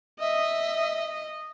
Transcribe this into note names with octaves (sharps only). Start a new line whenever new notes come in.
D#5 E5